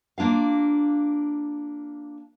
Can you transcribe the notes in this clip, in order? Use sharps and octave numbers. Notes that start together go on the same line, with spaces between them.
A#3 D4 F4 F5